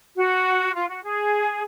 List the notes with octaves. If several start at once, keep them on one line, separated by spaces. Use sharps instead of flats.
F#4
F4
F#4
G#4